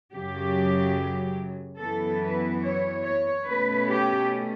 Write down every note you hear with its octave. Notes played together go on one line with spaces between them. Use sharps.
F#2 C#3 F#3 G4
F#2 E3 B3 E4 A4
B4
C#5
C#5
B2 A3 C#4 B4
G4